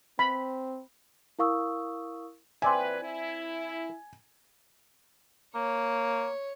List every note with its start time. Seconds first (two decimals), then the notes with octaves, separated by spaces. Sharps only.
0.19 C4 B5
1.39 E4 A#4 F5 C#6 D#6 E6
2.62 A#2 E3 C4 B4 D5 E5 G#5
3.03 E4
5.55 A#3 C#5